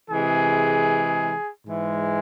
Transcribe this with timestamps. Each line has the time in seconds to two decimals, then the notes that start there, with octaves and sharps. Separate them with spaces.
0.10 C3 E3 G#3 G#4
1.65 G#2 E3 G#3